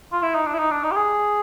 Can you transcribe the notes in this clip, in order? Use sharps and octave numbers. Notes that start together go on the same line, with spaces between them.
F4
E4
D#4
D4
E4
D#4
D4
D#4
G4
G#4